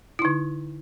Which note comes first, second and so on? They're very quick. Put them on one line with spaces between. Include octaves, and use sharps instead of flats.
E4 D#4 D3